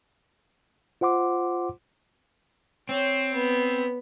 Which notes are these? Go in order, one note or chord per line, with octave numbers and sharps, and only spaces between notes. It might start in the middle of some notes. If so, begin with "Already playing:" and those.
F4 C5 F#5 C6 D6
C4 C#5
B3